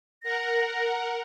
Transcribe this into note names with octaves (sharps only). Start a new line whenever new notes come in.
A#4 F#5 A#6